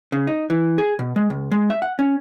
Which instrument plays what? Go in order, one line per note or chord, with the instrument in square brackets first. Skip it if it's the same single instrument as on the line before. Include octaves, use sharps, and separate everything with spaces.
[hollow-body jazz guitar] C#3
D#4
E3
G#4
B2
G#3
C#2
G#3
E5
F#5
C#4